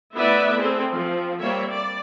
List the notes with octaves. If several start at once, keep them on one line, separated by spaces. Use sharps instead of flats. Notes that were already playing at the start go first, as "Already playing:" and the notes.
A3 B3 E4 B4 D5 E5
C4 G#4 A4
F3 C4
G3 A#3 C4 C#5 E5
D5